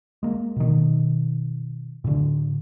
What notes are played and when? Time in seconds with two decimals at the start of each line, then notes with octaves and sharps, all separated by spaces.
0.23 G#3 A#3
0.56 B2 D#3
2.04 A2 D3